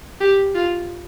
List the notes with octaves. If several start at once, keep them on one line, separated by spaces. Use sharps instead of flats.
G4
F4